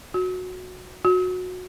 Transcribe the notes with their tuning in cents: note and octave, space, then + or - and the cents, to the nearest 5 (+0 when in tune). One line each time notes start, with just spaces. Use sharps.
F#4 -15
F#4 -20